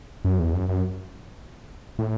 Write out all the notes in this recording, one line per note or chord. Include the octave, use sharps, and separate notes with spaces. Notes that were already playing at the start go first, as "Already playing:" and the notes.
F#2
E2
F#2
F#2
A2